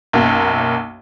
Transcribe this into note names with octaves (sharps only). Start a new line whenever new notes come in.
B1 F#2 A#3